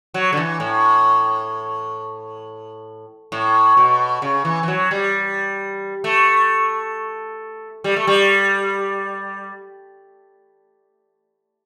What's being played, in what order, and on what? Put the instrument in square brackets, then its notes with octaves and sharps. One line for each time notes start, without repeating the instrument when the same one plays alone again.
[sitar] F#3
D3
E3
A2
A2
B2
C#3
E3
E3
F#3
G3
A3
G3
A3
G3